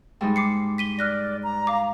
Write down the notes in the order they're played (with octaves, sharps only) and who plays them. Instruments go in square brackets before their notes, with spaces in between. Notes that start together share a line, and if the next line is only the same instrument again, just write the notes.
[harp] G#2 G3 D#4 [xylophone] G5
[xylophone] D6 C7 C#7
B6 D#7 G7
[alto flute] D5 [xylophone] F6 F#6 A#6
[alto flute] A#5
[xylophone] F5 D6